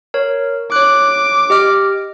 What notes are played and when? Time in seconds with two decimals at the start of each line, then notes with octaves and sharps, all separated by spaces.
0.14 A#4 C#5
0.72 C#5 D6 F#6
1.50 G4 D#5 F6